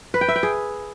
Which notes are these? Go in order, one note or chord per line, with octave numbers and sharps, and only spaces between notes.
B4
G5
E5
G5
G#4